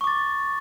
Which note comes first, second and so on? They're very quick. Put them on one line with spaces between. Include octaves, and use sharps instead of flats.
C#6 D6 A6